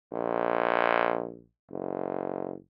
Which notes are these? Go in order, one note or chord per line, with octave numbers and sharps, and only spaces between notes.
A#1
F#1